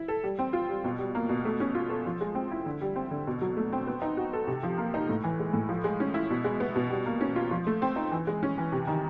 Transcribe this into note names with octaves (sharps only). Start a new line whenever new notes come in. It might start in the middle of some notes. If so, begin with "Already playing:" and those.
Already playing: E4
A4
G3
C4
F4
G3
B2
G3
A#3
B2
A3
C#4
F4
A4
F3
G#3
C4
E4
D3
G3
C4
D3
B2
F#3
A3
C4
B3
D#4
F#4
A4
C3
F3
A#3
D#4
A2
E3
G#3
A2
F3
G#3
C#4
E4
B2
G#3
B3
B2
G3
A#3
C#4
F4
F3
A3
C4
D#4
E3
G#3
C#4
E3
C3
D#3